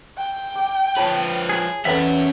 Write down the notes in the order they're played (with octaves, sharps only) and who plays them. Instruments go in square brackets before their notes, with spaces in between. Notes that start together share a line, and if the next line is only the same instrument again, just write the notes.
[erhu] G5
[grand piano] D6
[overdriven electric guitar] F3 B4 [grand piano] C#5 A5
[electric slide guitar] G#4
[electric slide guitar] E2 E5 [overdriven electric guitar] C#4 F#5 [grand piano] A4 B4 G5